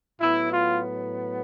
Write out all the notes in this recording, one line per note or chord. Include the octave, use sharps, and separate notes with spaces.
A2 F#3 B3 E4
F4